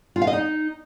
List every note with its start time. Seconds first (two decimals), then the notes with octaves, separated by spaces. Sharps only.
0.16 F4
0.22 F5
0.27 D#5
0.33 D#4